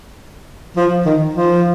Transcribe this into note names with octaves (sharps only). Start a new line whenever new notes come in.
F3
D#3
F3